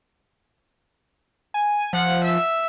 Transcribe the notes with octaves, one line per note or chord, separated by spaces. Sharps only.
G#5
F3 F#5
E5